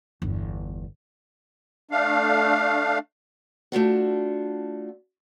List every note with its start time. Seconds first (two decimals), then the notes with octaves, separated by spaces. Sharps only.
0.22 G1 E2
1.91 A3 D4 F5
3.72 A3 D4 F4 F#4